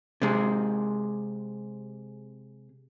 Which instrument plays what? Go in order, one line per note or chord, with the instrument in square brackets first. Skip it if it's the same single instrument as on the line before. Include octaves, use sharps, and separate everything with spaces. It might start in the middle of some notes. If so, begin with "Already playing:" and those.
[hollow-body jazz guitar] C3 G#3